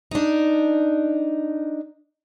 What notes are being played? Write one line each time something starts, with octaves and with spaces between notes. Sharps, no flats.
D4 D#4